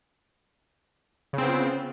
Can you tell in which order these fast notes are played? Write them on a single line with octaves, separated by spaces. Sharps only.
C#3 C4 B3 F4